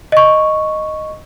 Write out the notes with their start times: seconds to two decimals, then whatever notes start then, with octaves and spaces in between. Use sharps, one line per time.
0.12 D#5 C#6